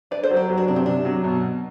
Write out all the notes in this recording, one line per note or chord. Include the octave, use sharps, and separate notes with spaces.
D4 B4 D5
A4 C5
F#3
G4 B4
F#3
D4 F#4
C3 D4
C4
C3 D4
F#3
B2